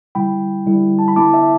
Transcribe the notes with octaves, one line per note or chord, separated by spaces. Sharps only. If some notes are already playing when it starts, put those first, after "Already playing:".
D3 G3 E4 G5 B5
D3 G3 E4
A5
B5
D3 B3 E4 A5 D6
E5 A5